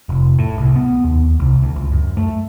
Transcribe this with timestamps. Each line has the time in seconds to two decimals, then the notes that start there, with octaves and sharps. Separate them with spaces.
0.09 F1
0.39 A2
0.58 C2
0.76 B3
1.04 D#2
1.40 C2
1.62 D2
1.76 C#2
1.92 F#2
2.17 A3